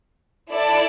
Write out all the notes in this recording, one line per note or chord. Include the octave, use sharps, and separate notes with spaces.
E4 A4 D5 A5